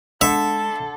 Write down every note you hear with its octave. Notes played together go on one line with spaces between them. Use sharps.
D3 G#3 D4 A4 E5